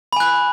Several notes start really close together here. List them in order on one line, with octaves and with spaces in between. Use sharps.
B5 G#5 F#6